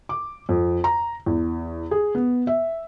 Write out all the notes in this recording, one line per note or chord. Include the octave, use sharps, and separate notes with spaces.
D6
F2
A#5
E2
G#4
B3
E5